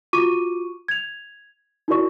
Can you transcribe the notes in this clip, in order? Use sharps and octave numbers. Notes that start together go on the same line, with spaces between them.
F4 F#4 C#6 D6 D#7
G#6 F7
D#4 E4 F#4 A#4 D5 C#6